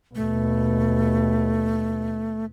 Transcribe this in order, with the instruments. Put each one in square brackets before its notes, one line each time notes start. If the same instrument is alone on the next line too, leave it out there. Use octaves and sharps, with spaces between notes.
[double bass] D#2 B2 [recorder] A3